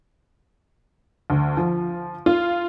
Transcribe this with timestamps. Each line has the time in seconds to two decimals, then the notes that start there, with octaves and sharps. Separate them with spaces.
1.30 D2
1.57 F3
2.26 F4